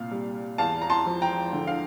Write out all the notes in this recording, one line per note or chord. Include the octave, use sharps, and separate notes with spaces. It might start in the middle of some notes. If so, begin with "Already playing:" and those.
Already playing: C2 A#2 F5
G3
E2 F5 A5
A#5
A5 C6
F3
G5 A#5
D3
F5